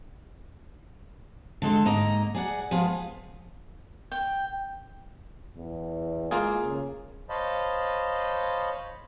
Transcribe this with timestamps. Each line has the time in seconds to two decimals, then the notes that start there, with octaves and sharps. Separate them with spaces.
1.62 D3 G#3 A4
1.85 G#2 A#3 D#5 A#5
2.35 G#4 D5 F#5
2.71 F3 G#3 B3 F4 G#4
4.12 G5
5.56 E2
6.31 G#3 A#3 F4 G#4
6.63 C#3
7.29 C5 C#5 D#5 F5 A5 B5